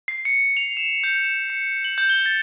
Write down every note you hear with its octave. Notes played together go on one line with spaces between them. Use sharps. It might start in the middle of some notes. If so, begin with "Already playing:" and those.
C7
C#7
F7
E7
G6
E7
C#7
F#7
G6
G7
A6